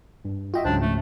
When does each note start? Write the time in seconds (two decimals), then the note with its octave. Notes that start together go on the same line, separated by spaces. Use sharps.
0.25 G2
0.54 F4 F#4 D#5 E5 G5
0.65 C#2 G#2 C#3 F#3 D4 C5
0.81 F3 A3